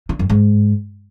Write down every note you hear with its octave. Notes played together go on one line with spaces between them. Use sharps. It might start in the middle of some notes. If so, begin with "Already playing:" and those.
D3
F#2
G#2